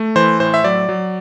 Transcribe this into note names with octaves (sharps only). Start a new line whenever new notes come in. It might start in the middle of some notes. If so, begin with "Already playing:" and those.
Already playing: A3
E3 C5
A2 C5
E5
F#3 D5
F#3